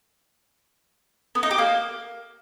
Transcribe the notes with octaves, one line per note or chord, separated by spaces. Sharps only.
B3
D#4
G4
A#3